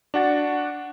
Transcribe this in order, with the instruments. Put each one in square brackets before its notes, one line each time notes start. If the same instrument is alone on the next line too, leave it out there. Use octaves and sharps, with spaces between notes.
[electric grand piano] D4 F#4 F#5 A6